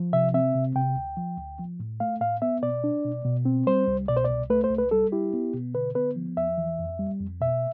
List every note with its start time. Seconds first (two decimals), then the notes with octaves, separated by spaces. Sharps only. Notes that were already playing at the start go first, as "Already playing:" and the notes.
Already playing: F3
0.13 C3 E5
0.34 C4 E5
0.55 C3
0.75 C3 G5
0.96 D2
1.17 F3
1.38 D2
1.59 F3
1.80 A2
2.00 A3 F5
2.21 A2 F5
2.42 B3 E5
2.63 B2 D5
2.84 D4
3.05 B2
3.25 B2
3.45 C4
3.67 G3 C5
3.88 C2
4.08 B2 D5
4.16 C5
4.24 C2 D5
4.50 A3 B4
4.64 C5
4.71 C2
4.78 B4
4.91 G3 A4
5.12 E4 G4
5.34 B3
5.54 B2
5.75 D3 B4
5.95 B3 B4
6.16 F3
6.37 E2 E5
6.58 E3
6.79 F2
6.99 G3
7.21 F2
7.41 B2 E5